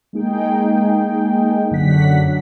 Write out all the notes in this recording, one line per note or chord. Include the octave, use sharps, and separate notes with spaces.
G#3 A#3 D#4 G#4 G5
F#2 D3 F#3 D4 F#5 B6